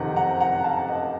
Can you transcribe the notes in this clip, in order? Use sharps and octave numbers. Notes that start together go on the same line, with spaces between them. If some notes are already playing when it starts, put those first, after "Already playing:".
Already playing: F#1 F2 C3 D#3 F#5 A#5
F#5 A#5
F#5 A#5
F5 A5
D#5 F#5